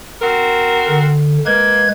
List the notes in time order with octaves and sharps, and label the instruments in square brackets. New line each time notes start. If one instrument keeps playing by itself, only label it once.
[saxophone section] C4 F#4 A#4
[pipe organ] D3
[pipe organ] G#3 B4 G#6 [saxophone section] A#3